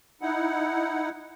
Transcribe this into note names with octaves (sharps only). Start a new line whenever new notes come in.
D#4 E4 F#5